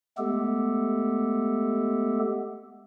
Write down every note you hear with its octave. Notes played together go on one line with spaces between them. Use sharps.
G#3 A3 B3 G4 A4